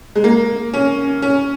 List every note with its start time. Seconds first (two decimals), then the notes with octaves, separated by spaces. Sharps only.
0.15 G#3
0.24 A#3
0.74 C#4
1.22 C#4